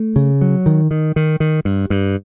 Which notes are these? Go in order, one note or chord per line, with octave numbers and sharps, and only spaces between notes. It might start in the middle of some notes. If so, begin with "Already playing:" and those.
Already playing: A3
C#3
F#3
D#3
D#3
D#3
D#3
G2
G2